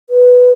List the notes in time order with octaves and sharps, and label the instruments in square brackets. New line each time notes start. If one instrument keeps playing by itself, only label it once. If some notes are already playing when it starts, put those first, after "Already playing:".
[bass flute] B4